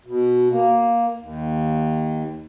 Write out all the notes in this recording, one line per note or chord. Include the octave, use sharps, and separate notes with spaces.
B2
A#3
D#2